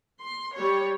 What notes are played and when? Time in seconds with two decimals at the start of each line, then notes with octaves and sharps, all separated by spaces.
0.21 C6
0.56 G3 C#5